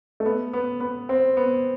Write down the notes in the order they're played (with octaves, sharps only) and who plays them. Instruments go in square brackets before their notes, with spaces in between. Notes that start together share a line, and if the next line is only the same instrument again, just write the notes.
[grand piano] A3
B3
B3
B3
C4
B3